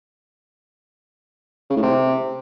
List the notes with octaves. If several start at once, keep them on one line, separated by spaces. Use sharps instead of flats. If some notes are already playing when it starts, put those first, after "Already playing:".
C#3
A2
C3